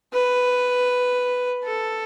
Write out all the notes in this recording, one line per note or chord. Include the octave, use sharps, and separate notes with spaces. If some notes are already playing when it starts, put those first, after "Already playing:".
B4
A4